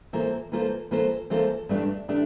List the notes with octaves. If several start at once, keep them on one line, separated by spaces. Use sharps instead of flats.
E3 A#3 F4 A4 C5
E3 A#3 F4 A4 C5
E3 A#3 F4 A4 C5
E3 A#3 F4 A4 C5
G2 E3 A3 D4 G4
E3 A3 D4 G4